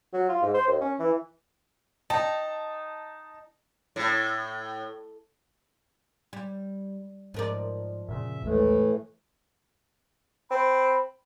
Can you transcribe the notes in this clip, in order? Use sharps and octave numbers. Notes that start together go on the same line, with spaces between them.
F#3
F4
G#2
C5
D#2
C#4
E3
D#4 G5 A5
A2
G3
G#2 F3 A#4 D5
F#2 A#2 C#3 E5
A#1 D#2 A2 E3 G#3 A3
C4 B5